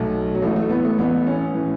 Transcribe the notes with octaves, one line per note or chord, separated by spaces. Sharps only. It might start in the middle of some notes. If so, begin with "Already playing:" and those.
Already playing: B1 B2 A3
F#3
A1 A2 E3 A3
A3
B3
A3
A1 A2 E3 B3
C#4
A2 E3